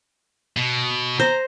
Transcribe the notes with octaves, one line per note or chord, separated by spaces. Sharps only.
B2
C5 A#5